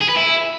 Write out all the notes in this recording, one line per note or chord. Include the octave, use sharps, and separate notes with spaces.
G#4
B4
E4